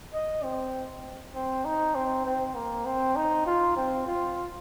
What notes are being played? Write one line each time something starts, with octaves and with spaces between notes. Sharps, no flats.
D#5
C4
C4
D#4
C4
C4
A#3
C4
D#4
F4
C4
F4